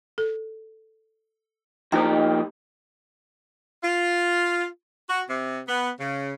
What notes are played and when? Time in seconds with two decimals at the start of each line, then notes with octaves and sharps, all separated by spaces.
0.18 A4
1.92 F3 A#3 D#4 G4 C5 G5
3.82 F4
5.09 F#4
5.28 C3
5.67 B3
5.99 C#3